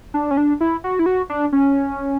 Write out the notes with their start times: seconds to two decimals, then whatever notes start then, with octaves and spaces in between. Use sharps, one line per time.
0.14 D4
0.31 C#4
0.37 D4
0.61 E4
0.84 F#4
0.99 E4
1.06 F#4
1.30 D4
1.52 C#4